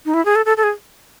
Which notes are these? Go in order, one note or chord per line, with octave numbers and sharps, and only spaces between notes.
D#4
E4
G#4
A4
A4
A4
G#4